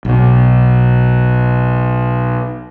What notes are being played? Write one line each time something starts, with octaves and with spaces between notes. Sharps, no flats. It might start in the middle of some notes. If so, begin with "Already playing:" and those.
B1 B2